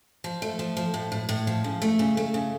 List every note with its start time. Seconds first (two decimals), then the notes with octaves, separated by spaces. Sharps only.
0.24 F3
0.42 A3
0.59 F3
0.77 F3
0.94 A2
1.12 A2
1.29 A2
1.47 F3
1.64 C#3
1.82 A3
1.99 C#3
2.17 A3
2.34 C#3